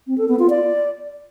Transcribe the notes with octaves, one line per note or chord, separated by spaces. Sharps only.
C4
A4
B3
F4
D5